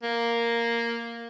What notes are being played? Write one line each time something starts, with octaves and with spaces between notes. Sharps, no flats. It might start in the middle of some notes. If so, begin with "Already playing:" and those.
A#3